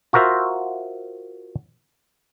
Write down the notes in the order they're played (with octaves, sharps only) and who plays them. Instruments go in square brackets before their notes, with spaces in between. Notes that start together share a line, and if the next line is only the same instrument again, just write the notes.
[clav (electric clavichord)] F4 F#4 A#4 C5 E5